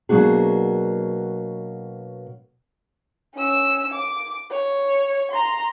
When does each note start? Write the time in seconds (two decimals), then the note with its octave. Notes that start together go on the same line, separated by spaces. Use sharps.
0.09 B2 F#3 A#3 D4 F#4 G#4
3.35 C#4 E6
3.93 D6
4.51 C#5
5.32 A#5 C6